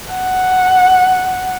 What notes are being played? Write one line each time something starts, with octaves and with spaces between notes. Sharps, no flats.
F#5